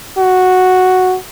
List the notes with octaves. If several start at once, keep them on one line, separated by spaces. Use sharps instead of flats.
F#4